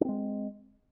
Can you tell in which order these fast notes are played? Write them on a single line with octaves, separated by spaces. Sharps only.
D4 C4 G#3